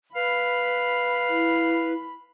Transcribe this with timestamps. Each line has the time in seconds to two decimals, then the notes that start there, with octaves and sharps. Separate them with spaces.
0.15 B4 F5 B5
1.29 E4